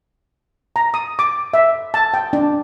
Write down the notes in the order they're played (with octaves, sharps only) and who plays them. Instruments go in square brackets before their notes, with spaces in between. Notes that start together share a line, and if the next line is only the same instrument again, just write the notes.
[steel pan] A#5
D#6
D6
E5
A5
G5
D4